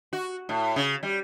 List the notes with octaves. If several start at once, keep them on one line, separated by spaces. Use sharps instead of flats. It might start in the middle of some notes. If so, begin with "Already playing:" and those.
F#4
A2
C#3
G3